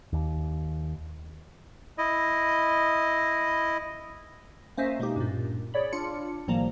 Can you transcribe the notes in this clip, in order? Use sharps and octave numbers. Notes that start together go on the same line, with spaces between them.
D#2
E4 D#5
A#3 C#4 C5 D#5 E5
B2 G#3 A#3 D#4 G4
G2 A#2
G#4 C#5 D5 B5
D4 F4 C#7
G#1 A2 F3 G3 A#3 A#5